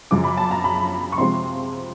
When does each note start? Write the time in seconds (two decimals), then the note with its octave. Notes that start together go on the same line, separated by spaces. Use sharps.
0.11 F#2 C#3 F3 D6
0.24 B5
0.37 A5
0.51 A#5
0.64 B5
1.12 C#6
1.18 C3 F3 G#3 C4 C6